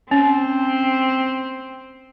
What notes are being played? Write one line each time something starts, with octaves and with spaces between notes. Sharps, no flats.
C4 C#4